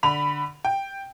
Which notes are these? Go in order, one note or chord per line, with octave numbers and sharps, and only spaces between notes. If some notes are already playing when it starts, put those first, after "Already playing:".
D3 B5 F7
G5